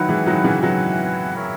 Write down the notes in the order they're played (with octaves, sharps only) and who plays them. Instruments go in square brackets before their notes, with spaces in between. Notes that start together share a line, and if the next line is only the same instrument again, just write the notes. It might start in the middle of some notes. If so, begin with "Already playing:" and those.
Already playing: [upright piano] D#3 F#3 [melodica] E4 B4 F#5
[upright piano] E3 G#3
D#3 F#3
C#3 E3
[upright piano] D#3 F#3 [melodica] E4 B4 F#5
[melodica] E4 A#4 C#5 E5